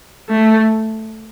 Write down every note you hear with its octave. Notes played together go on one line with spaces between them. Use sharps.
A3